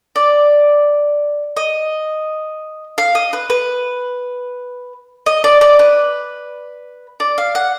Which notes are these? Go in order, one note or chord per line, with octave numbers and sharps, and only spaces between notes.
D5
D#5
F5
D#5
B4
B4
D#5
D5
D5
B4
D5
F5
F#5